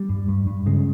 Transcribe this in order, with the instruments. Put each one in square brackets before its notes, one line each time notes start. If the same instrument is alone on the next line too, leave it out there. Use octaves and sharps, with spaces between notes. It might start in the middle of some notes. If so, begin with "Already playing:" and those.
Already playing: [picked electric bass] G3
G2
G2
G2
C#3 G#3